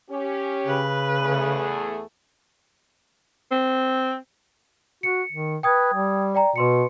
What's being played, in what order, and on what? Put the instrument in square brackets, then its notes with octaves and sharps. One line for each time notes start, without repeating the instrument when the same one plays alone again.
[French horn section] C#4 G4
[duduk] C#3 [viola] B4
[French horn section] E2 A3 G#4
[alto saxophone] C4
[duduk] F#4 [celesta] C#7
[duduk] D#3
[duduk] B4 [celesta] G5 D#6 G#6
[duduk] G3
[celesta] D5 G5 A#5
[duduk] B2 [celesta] B4 C6 C#7